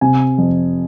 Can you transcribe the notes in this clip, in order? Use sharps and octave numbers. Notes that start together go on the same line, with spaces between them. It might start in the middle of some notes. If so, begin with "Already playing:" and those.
C3 G#5
F2